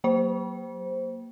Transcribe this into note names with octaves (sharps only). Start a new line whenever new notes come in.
F#3 A#3 C5